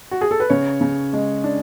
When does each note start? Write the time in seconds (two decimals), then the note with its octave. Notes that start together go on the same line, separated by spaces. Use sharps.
0.11 F#4
0.21 G#4
0.31 A4
0.40 B4
0.50 C#3 C#5
0.81 C#3
1.13 G#3
1.44 D4